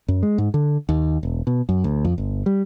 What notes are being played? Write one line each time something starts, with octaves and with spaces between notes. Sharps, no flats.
F#2
G#3
G#2
D3
D#2
E1
B2
F#2
D2
F2
G1
G3